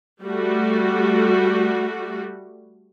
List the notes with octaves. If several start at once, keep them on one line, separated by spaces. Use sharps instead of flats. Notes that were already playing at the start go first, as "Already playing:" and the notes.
G3 A3 F#4